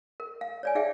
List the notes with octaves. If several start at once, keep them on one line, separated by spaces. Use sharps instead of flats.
A#4
F5
C#5 D5 G#5
D#4 G#4 D5 E5 F5 G5